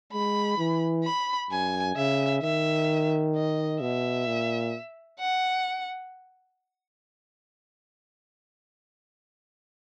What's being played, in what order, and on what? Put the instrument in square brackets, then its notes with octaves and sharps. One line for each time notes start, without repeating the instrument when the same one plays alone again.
[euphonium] G#3 [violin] B5
[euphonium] E3
[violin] B5
[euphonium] F#2 [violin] G#5
[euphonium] C#3 [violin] E5
[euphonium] D#3 [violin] E5
[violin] D#5
[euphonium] B2 [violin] E5
[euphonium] A#2
[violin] F#5